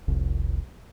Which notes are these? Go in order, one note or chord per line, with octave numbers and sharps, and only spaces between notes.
F1 C2